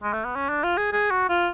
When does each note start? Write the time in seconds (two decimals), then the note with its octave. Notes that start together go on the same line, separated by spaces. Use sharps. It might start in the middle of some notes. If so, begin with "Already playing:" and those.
0.03 G#3
0.13 A3
0.25 B3
0.35 C#4
0.49 D4
0.64 F4
0.77 G#4
0.92 G#4
1.11 F#4
1.29 F4